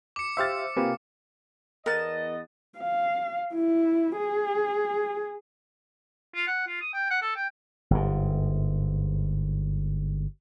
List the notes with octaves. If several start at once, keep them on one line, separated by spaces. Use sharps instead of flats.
D6 C#7 E7
G4 C5 E5 F5 E6 F6 A6
C3 A#3 F4 G4 B4 F5 G#5
E2 B3 A#4 D#5 A5
F5
E4
G#4
F4
F#5
F4
D#6
G5
F#5
A4
G5
G1 G#2